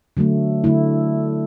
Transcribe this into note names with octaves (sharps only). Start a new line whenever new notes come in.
D3 F#3 A3
D3 A3 E4